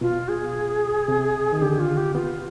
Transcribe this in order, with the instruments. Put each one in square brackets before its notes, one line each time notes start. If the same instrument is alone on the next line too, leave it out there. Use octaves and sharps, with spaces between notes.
[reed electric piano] B2 [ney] F4
[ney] G#4
[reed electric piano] C3
D#3
[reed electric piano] D3 [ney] G4
[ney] F4
G4
[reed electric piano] B3 [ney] F4